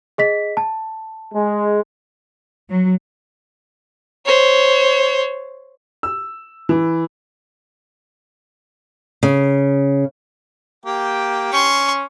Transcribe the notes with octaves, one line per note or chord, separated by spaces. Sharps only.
G#4 D#5 B6
A5
G#3
F#3
C5 C#5
E6
E3
C#3
A#3 G4 G5
C#4 C6 C#6